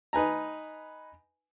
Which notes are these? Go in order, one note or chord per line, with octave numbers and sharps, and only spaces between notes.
D#4 B4 G#5 A#5